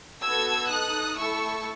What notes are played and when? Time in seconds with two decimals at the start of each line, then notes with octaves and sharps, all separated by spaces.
0.22 B3 F#4 A4 E6 G#6
0.70 D#4 A4 D#6 F#6
1.17 A3 E4 A4 C#6 E6